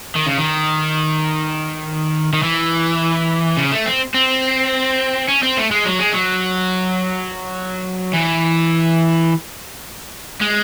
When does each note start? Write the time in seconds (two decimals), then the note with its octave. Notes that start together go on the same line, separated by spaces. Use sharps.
0.16 D#3
0.27 C#3
0.38 D#3
2.33 D#3
2.43 E3
3.57 C#3
3.72 A3
3.86 C4
4.15 C4
5.29 C#4
5.43 C4
5.57 A3
5.71 G#3
5.85 F#3
5.99 G#3
6.12 F#3
8.13 E3
10.41 G#3